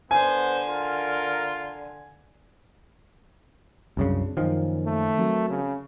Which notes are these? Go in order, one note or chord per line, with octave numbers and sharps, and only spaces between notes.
D3 B3 C5 G#5
F4 A#4
C2 F#2 C#3 C4 D4
F#2 A#2 D#3 F3
A3
F#3 C4 A#4
C#3